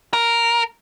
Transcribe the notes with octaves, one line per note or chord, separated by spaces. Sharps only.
A#4